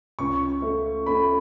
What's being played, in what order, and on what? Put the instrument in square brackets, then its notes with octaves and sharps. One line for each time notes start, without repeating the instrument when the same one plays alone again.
[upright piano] C#2 [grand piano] C#6
[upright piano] A3
[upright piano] A3 [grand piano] B5